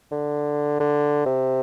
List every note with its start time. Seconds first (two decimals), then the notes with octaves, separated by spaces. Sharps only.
0.11 D3
0.80 D3
1.26 C3